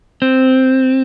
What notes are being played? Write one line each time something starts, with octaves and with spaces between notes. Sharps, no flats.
C4